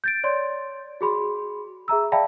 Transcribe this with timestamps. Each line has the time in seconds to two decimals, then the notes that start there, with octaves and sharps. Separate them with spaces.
0.04 G6 A6 D7
0.24 C#5 D5 C6
1.01 F#4 G#4 B5 C6
1.88 G#4 E5 A#5 E6
2.12 D5 E5 F5 G5 A5 B5